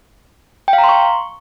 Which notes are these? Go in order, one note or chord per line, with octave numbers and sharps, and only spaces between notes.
G5
F5
A#5
C6
C#6